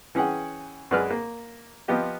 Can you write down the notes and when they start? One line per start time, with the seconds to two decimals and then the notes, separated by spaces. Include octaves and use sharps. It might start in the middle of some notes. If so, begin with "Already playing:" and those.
0.15 E3 C#4 G#4 F#5 G5
0.91 F#2 G#3 B4 D5 F6
1.11 A#3
1.88 F3 B3 F4 G4 D#5